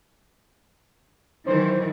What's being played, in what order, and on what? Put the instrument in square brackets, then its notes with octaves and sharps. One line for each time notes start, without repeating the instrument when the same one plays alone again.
[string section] D#3 E3 F#3 [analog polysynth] C5